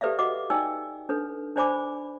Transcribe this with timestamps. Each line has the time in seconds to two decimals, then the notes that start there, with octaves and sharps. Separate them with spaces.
0.01 G4 A4 B4 D5 E5 F5
0.19 F#4 D#5 F#5 D6
0.50 D#4 D5 G5 G#5 E6
1.09 D4 A4 B4
1.56 D4 C5 D5 G#5 B5 D6